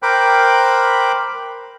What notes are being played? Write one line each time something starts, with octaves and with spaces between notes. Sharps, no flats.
A#4 C5 G5 B5 D6 F#6